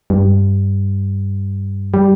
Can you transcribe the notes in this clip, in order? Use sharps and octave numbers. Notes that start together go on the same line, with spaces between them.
G2
G3